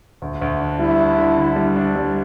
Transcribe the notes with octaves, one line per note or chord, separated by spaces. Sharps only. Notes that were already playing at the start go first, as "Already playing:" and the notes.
D2
D2
D4
G3 E4
D4
D3
D3
G3
D4
G3